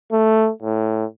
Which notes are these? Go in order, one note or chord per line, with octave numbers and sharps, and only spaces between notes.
A3
A2